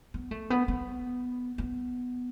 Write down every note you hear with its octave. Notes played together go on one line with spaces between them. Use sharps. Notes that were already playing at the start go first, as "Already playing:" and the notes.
B3
A3
B3
B3
B3